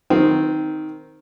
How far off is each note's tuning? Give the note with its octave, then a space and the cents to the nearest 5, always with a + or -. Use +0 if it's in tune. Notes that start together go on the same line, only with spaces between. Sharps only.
D#3 +0 C4 -10